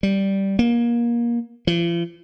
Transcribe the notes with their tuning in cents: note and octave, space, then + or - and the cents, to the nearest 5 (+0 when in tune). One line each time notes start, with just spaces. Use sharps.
G3 -5
A#3 +25
F3 -45